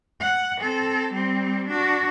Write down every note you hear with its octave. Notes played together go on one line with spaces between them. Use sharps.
F#5
C4 A4
G3 C4
D4 F#4